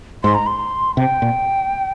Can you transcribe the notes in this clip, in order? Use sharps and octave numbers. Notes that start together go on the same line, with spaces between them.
G#2 C6
A#5
C6
C3 G5
A#2